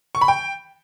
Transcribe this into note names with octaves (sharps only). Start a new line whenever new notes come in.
C#6
B5
G5